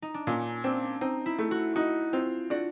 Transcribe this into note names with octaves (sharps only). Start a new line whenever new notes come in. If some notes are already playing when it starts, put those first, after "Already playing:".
D#4
D4
A#2 C#4
C4 D4
C4 D#4
E4
A3
F#4
D#4 F#4
C4 F4
D4 F#4